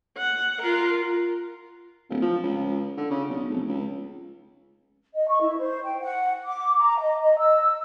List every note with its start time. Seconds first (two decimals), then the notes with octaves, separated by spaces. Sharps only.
0.18 F#5
0.62 F4 A#4
2.09 D1
2.22 F3
2.43 C#2
2.97 D3
3.11 C#3
3.29 B1
3.49 F1
3.68 C#2
5.14 D#5
5.28 C#6
5.40 E4
5.59 C5
5.84 G5
6.00 F#5
6.43 D6
6.78 A#5
6.98 D#5
7.20 D#5
7.38 E6